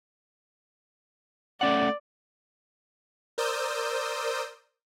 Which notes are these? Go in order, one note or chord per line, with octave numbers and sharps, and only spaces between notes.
A3 C#4 D5 F#5
A#4 C5 D5 D#6 E6 G6